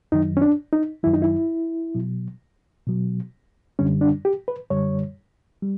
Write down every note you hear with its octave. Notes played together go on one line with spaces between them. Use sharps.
F#2 D#3 F#3 D#4
C#4
D4
D#4
F#2 D#3 F#3 E4
D#4
E4
B2 F#3
B2 F#3
F#2 D3 G3 C#4
D4
G4
B4
F#2 D3 G3 C#5
G3